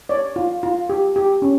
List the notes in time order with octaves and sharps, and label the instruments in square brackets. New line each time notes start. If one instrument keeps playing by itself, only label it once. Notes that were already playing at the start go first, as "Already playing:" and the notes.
[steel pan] C#5 D5
F4
F4
G4
G4
C#4